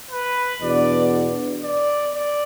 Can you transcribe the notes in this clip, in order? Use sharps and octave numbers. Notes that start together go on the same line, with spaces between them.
B4
E2 B2 B3 D4 D5
D5
D5